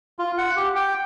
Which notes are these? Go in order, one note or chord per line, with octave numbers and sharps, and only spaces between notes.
F4
F#5
G4
G5